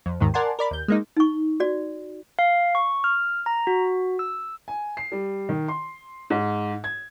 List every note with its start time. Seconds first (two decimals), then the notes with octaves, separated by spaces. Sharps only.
0.06 F2
0.20 D#2 G#2 D#3
0.34 A#4 D5 F#5 G#5 A5 C6
0.59 A#4 D5 B5
0.71 D#2 G6
0.88 G#3 A#3 D#4
1.17 D#4 C#6
1.60 F#4 D5
2.39 F5
2.75 C#6
3.04 F6
3.46 A#5
3.67 F#4
4.19 E6
4.68 G#5
4.97 C7
5.12 G3
5.49 D#3
5.68 C6
6.30 G#2
6.84 G#6